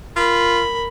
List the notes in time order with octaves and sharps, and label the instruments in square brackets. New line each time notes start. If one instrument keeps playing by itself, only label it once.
[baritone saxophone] F4 [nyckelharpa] A#4 B5